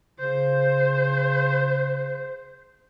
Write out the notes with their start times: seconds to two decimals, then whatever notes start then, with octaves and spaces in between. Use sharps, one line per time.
0.19 C#3 C5